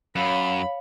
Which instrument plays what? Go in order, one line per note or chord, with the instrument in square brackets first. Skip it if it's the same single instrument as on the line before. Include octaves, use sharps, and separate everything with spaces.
[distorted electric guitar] F#2 [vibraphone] C#5 F5 [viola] B5